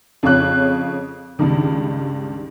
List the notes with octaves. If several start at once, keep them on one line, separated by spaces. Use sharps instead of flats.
F2 C#3 F4 C#5 F#6
C#2 G2 D#3